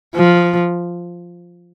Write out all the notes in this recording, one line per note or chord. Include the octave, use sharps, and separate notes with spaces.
F3